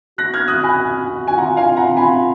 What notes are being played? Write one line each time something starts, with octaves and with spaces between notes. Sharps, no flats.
F#4 F#6 A#6
F6 G#6
D#6 F#6
G#5 B5
F#4 G#5
F4 F#5 A#5
F5 G#5
F#5 A#5
F4 G#5 B5